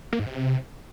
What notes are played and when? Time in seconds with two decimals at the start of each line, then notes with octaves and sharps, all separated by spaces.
0.13 A#3
0.19 G#2
0.26 C3